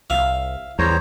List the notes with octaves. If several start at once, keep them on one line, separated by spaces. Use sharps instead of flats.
C2 E5 F5
E2 G3 C5 C#5 A#5